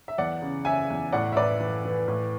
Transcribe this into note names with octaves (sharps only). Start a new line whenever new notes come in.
E5
E2 D5 F#5
C#3
C#3 E5 G#5
E2
A2 D5 F#5
E5
A2 B4 D5
E3
E3
A2